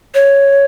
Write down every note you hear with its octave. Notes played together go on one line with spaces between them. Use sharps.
C#5